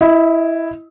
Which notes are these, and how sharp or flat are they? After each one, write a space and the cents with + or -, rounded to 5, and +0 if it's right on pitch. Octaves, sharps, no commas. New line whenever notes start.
E4 +0 D#5 +25